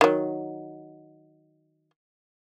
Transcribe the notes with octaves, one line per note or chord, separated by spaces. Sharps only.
D#3 F#3